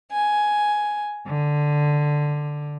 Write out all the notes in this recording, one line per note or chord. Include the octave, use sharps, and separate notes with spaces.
G#5
D3